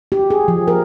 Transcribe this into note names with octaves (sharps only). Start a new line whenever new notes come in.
G4
G#4
F3
A#4